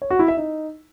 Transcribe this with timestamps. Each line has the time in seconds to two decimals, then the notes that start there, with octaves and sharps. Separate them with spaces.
0.02 C#5
0.10 F#4
0.19 E4
0.28 E5
0.37 D#4